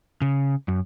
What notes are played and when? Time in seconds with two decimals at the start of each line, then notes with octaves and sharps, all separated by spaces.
0.22 C#3
0.68 F#2